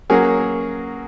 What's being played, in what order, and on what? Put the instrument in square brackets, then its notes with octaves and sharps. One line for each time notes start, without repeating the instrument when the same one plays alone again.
[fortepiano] F#3 A#3 C#4 G#4 A#4